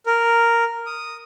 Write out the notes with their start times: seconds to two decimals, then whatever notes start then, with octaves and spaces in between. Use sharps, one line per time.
0.06 A#4
0.86 D#6